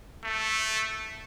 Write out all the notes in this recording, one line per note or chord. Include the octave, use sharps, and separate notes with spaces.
A3